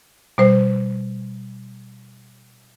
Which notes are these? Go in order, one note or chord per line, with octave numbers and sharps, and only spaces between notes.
B2 G3 C5